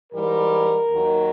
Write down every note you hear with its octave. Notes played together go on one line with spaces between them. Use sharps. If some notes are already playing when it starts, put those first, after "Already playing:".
G#2 E3 G3 A#4
D#2 D#3 F#3